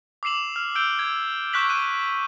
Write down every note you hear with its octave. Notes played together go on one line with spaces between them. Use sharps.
D6 E6 C7 E7 F#7
F6
E6 G6 D7 G7
G#6
C#6 F#6 G6 B6 F#7
F#6 D7 D#7